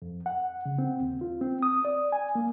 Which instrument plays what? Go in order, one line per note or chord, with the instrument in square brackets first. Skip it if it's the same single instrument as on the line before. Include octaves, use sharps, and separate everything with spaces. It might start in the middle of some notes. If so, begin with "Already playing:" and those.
[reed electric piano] F2
F#5
C#3
C4
D#2
F4
C4
D#6
D5
G#5
A#3